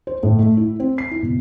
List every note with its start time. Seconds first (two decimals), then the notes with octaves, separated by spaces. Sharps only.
0.07 C5
0.23 A2
0.39 A3
0.57 E4
0.80 C4
0.98 C7
1.11 E4
1.23 B2